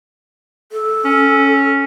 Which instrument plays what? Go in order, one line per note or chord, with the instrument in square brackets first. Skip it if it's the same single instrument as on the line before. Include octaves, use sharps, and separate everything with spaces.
[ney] A4
[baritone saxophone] C#4